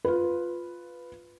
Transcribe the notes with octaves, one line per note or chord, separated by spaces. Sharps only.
F4 B4